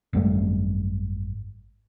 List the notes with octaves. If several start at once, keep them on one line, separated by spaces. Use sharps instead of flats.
G#1 F#2 G3 A3